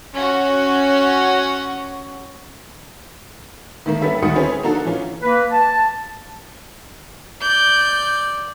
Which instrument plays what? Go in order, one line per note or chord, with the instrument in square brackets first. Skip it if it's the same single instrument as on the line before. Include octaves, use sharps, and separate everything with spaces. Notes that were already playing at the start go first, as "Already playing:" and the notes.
[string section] C#4 F#4
[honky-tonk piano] D#3 A3 A#3
G3 B3 C#4 A4 B4 E5
D2 D#3 G3 F#4 D#6 C#7
C4 C#4 E4 G#4 B4 C5
A#3 D4 D#4 F#4 A4
E3 C#4 F4
[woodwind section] A#3 B4
A5
[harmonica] D5 [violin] G6